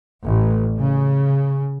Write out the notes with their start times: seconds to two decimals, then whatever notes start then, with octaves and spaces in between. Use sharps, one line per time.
0.24 A1
0.78 C#3